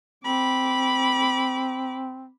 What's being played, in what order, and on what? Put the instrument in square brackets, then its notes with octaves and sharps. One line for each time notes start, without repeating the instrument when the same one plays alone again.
[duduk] C4 [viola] B5 D6